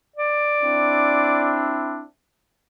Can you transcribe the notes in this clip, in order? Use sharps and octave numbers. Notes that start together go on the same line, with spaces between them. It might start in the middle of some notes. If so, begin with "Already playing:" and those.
D5
C4 D4 E4